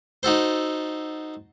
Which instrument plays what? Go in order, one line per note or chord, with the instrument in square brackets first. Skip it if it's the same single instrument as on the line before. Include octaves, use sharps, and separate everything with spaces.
[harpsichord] D#4 F#4 A4 C5